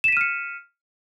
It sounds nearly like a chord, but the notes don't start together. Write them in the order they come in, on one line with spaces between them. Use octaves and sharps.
E7 B6 D#7 F6 C#7